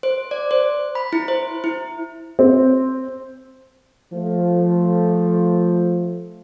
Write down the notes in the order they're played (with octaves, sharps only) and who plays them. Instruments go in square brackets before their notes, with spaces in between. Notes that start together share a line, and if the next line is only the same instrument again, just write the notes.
[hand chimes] C5
D5
C5
B5
E4
C5
E4
[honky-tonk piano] C4
[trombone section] F3 A3